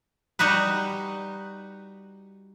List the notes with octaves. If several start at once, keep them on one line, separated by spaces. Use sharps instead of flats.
G3 D#4 F#4 B4